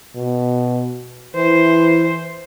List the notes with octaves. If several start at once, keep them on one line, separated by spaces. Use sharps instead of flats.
B2
E3 C5